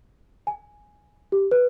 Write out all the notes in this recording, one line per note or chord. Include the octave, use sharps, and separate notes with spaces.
G#5
G4
B4